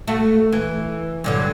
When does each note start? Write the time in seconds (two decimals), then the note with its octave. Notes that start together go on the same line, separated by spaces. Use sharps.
0.07 A3 F#4
0.52 E3
1.24 G2 D3 F#3